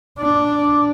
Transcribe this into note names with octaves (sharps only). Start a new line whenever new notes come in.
D4